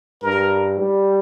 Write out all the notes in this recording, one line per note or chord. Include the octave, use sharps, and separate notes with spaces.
G2 A#4
G3